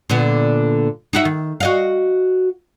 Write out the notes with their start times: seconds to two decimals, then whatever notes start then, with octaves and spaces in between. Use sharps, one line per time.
0.10 A#2 D3 B3
1.13 D#4 F#4 E5
1.25 D#3
1.60 F#4 D#5 F5